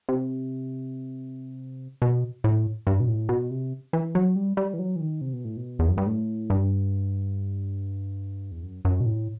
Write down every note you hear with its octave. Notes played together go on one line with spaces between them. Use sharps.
C3
B2
A2
G2
B2
A2
B2
C3
E3
F#3
G3
G3
E3
F#3
E3
D#3
C3
B2
A2
B2
E2
F#2
G2
A2
G2
E2
F#2
F#2
B2
A2